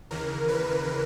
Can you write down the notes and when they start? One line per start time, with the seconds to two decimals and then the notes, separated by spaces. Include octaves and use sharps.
0.11 D#2 C#3 E3 A#4
0.49 B4